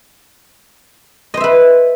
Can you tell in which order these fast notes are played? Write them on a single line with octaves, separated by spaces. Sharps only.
D#5 C5 E5 B4